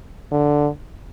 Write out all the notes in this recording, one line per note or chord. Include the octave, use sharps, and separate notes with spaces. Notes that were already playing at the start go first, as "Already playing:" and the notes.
D3